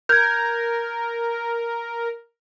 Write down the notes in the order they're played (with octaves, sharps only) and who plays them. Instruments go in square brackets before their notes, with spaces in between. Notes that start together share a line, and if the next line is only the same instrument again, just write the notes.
[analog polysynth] A#4 [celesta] G6 G#6